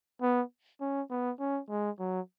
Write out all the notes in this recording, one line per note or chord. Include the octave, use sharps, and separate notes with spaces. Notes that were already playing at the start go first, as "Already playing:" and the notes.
B3
C#4
B3
C#4
G#3
F#3